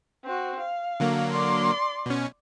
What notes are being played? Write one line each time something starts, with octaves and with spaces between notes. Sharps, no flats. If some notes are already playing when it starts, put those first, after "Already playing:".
C4 F#4
F5
D3 F#3 A#3
D5 C6
B2 C#4